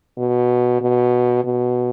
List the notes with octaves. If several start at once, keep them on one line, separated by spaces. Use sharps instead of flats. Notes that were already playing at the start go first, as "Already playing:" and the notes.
B2
B2
B2